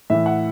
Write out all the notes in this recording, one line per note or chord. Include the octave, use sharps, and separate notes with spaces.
A2 E3 E5
F#5